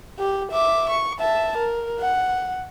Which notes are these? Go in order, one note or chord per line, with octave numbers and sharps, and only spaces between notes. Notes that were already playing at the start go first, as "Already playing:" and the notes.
G4
E5 D6
C#6
E5 A5
A#4
F#5